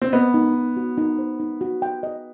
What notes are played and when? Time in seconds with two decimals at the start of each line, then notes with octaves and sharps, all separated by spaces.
0.02 C4
0.13 B3 D#5
0.34 D#4
0.54 D#4
0.77 F#4
0.98 D#4
1.19 C5
1.40 D#4
1.61 F#4
1.82 G5
2.03 D#5